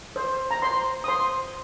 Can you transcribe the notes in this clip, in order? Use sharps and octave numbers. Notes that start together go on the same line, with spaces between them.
C5
A#5
C5 C6
D#6
C5 C6